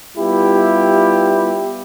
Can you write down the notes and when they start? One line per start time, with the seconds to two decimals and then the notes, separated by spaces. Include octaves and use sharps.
0.17 G3 B3 E4 F4 G4